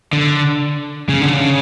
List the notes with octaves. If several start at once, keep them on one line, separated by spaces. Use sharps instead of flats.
D3
C#3
D3
C#3